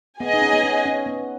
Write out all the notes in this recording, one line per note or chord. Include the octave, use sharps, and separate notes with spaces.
B3 G#4 D#5 G#5
D#4
C#4
B3
C#4
C#4
B3